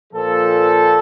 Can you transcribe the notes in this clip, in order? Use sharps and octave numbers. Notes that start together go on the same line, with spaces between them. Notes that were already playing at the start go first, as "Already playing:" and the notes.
A#2 F3 A4